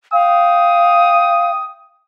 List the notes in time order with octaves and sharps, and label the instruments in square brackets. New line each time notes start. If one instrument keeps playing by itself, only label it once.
[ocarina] F5 [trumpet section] G5 D#6